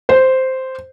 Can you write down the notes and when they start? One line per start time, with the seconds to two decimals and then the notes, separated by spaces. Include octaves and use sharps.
0.09 C5